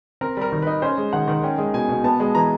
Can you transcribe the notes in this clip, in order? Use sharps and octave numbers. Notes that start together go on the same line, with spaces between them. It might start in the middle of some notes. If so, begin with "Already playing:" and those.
C4 A#4
G3 A#4
D#3
D#4 B4
C#4 C5
G#3
D#3 F#5
D#3
C#4 G5
G#3
B2 G#5
B2
B3 A5
G#3
E3 A#5